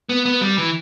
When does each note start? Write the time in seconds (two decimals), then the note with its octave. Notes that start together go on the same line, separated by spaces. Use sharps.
0.09 B3
0.26 B3
0.41 G3
0.58 E3